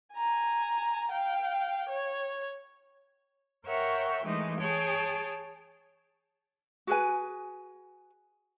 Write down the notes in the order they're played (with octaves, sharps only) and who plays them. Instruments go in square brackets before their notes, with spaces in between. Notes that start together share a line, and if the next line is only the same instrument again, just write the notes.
[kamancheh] G#5 A#5
F5 G5
C#5
[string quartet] A#4 C#5 E5 F#5 G5
E3 G#3 A3 D#4
G#4 C#5 G5 A5
[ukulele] F#4 G#4 B4 G#5